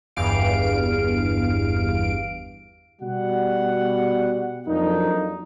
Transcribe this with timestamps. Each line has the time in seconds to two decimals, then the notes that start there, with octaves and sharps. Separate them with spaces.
0.16 G1 E2 G2 F5 D7
3.02 B2 G3 F#4 F#5
4.67 F2 F#3 A#3 D4 D#4